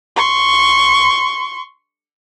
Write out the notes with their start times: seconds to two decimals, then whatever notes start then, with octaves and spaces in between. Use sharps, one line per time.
0.16 C6 C#6